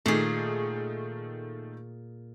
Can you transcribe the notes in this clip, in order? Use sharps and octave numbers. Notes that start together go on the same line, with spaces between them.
A#2 D#3 A3 G#4